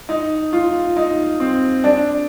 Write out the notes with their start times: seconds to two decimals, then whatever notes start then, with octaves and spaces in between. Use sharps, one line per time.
0.09 D#4
0.53 F4
0.97 D#4
1.40 C4
1.84 D4